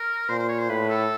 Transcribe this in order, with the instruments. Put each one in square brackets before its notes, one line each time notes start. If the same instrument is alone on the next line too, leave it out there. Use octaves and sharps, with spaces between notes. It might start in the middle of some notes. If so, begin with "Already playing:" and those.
Already playing: [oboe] A#4
[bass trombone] A#2 [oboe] C5
[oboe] C5
C#5
C5
[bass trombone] A2 [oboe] B4
[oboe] A4